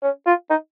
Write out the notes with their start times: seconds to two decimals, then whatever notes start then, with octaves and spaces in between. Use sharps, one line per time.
0.03 C#4
0.26 F4
0.50 D#4